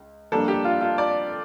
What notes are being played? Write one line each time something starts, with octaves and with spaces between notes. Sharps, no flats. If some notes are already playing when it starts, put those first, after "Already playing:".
Already playing: C#2
F2 D3 G3 A#3 D4 A4
G4
F4
F4
D5